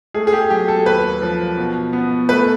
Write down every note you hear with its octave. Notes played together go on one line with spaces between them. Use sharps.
A3 G#4
G#4
G4
F#3 G4
A4
D#2 B4
F3
B2
B3
A3 B4